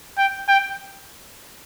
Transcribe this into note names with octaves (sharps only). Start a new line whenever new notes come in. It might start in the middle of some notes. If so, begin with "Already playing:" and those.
G5
G5